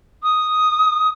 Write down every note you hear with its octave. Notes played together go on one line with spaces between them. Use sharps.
D#6